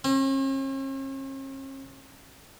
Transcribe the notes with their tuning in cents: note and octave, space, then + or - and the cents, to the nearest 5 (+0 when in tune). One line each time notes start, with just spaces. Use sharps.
C#4 -45